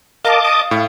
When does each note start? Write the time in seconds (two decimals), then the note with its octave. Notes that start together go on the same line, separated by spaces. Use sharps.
0.25 A#4 D#5 F5 A5 D6
0.43 D#6
0.71 A2 F5